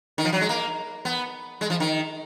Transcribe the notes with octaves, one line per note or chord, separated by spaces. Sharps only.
D#3
F3
F#3
G#3
A#3
B3
G#3
F3
D#3